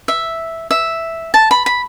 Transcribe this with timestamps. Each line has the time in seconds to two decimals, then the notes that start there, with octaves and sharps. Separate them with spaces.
0.08 E5
0.71 E5
1.34 A5
1.51 B5
1.66 B5